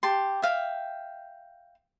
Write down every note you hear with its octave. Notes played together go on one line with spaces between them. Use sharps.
G4 A5 C6
E5 F5 G5